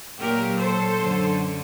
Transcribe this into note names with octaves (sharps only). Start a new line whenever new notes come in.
A#2 F#3 G4 A#4
A4 C5
F#2 D3 F#3